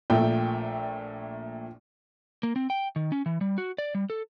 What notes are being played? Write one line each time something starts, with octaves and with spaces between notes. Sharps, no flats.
A#1 A#2 A3 G5
A#3
C4
G5
D#3
C#4
E3
G3
F#4
D5
G3
A4